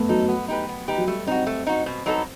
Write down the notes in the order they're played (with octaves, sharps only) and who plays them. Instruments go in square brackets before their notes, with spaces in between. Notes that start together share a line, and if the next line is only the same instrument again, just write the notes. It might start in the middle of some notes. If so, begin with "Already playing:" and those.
Already playing: [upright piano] A3 B3
[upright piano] F#3 [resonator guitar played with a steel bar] D#4 A4
[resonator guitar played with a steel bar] B3
D#4 G4 B4
B3
D#4 G4 B4
[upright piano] F#3
[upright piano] G3 [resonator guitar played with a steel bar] A3
[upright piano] C4 [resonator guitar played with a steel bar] D#4 F#4
[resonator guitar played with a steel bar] A3
D#4 F#4
B2
F#3 B3 D#4 A4